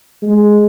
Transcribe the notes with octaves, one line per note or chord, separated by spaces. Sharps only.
G#3